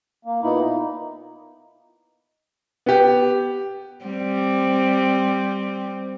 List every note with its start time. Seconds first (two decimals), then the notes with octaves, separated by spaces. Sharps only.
0.25 A#3
0.42 A#2 A#3 B3 D#4 E4
0.61 D#4
2.86 B3 G4
4.05 G3 C4